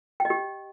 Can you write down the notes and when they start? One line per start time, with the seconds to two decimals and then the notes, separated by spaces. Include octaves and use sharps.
0.20 G5
0.25 D#5
0.30 G4